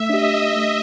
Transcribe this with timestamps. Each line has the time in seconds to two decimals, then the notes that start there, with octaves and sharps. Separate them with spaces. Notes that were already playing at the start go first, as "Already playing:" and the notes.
Already playing: A3 E5
0.09 D4 G4 D#5
0.56 A3